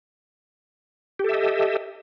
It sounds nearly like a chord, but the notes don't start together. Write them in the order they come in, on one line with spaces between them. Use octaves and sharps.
G4 A4 E5 D#5